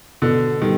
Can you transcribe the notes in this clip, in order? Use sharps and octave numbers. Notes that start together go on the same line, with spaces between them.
B2 D3
D#3 G3